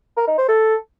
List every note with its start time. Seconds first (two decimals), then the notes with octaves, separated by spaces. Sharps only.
0.17 A#4
0.27 D#4
0.38 C5
0.48 A4